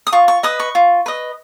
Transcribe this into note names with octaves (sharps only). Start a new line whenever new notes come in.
D#6
F4 C#6
C#6
B4 D#5 D#6
C#6
F4
B4 D#5